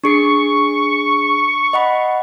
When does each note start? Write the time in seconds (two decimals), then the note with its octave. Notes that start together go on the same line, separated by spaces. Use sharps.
0.04 D4 G#4 C#6 C7
1.73 D#5 F#5 B5